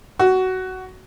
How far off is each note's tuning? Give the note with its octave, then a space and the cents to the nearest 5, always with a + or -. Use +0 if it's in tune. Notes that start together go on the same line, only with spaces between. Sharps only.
F#4 +15